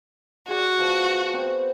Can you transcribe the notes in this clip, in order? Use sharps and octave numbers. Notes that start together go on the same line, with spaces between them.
F#4 G#4 D5
F3 B3 D5
B3 C4 C5